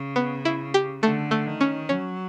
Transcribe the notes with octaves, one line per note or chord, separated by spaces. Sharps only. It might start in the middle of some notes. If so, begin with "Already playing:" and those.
Already playing: C#3
B3
E4
G4
D3 A3
A3
D#3
C#4
F#3 C#4